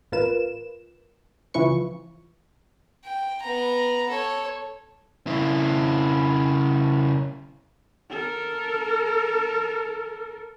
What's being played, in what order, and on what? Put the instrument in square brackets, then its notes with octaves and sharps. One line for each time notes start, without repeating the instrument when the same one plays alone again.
[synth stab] A1 F4 A#4 B4 E7
C#2 E3 F3 E4 B4 C#6
[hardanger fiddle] G5
B3 A#5
A4 C#5
[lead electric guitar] C#3 E4
[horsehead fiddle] A4 A#4